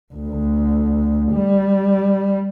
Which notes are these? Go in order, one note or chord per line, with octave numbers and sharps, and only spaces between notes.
D2
G3